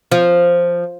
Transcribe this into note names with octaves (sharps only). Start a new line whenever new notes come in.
F3